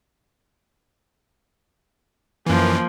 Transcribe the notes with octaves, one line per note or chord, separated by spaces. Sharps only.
F#2 E3 F3 A#3